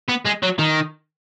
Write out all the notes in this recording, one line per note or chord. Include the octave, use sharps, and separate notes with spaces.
B3
G#3
F#3
D#3